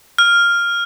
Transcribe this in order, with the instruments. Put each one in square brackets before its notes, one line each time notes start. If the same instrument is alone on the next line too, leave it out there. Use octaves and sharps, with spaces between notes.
[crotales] F6